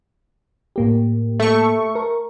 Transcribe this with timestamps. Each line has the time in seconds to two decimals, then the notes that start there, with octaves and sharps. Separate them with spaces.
0.76 A2 A#3 G4
1.40 A3 C#6
1.95 A#4